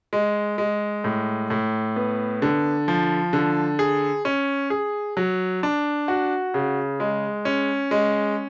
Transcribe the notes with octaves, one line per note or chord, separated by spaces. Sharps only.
G#3
G#3
A2
A2
B3
D3
F3
D3
G#4
C#4
G#4
F#3
D4
F#4
C#3
G#3
C#4
G#3